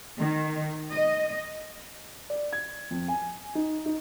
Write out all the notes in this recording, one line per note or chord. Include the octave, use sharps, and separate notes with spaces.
D#3
D#5
D5
G#6
F2
G#5
D#4
D#4